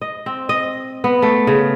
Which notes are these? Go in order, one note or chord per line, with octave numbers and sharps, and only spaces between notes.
D#5
C4
D#5
B3
A3
C#3